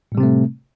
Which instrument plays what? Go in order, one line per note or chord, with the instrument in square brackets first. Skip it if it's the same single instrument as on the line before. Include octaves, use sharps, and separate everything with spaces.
[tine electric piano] A2
G3
C3
C4
A3